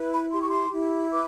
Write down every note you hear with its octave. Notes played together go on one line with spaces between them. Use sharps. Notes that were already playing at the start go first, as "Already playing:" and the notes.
Already playing: E4 B4
B5
G4 C6
C#6
C6
E4
B4 D6